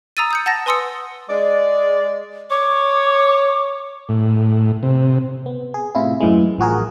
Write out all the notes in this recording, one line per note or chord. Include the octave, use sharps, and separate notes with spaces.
A#5 D#6 E6 A6 D#7
D#6 G6 C#7
F#5 A5 A6 A#6
B4 G#5 C6 D#6 E6 C#7
G#3 D5
C#5 D6
A2
C3
B3
G#4
A2 C3 E4 F4
F#2 A2 E3 G#3
A1 F3 F#4 G#4 A#4